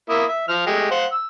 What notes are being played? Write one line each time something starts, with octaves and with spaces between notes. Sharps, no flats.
A#3 E4 D#6
E5
F3 F6
G#3 A3 G4
C5 F5 F#5
E6